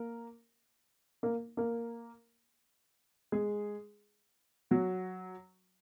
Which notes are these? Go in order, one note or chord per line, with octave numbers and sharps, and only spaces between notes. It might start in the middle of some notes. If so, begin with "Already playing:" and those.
Already playing: A#3 A#4
A#3 A#4
A#3 A#4
G#3 G#4
F#3 F#4